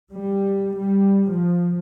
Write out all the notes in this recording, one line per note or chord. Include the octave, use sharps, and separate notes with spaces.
G3
G3
F3